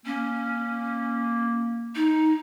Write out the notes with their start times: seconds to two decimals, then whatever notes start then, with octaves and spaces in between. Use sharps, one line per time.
0.06 A#3 C#4
1.95 D#4